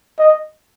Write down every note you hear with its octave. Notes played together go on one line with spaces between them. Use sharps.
D#5